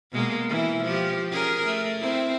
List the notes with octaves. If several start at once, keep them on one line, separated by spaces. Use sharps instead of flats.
B2 G#3 A#3
E3 E4
F3 G4
C#4 G#4 A#4
A3
C4 E4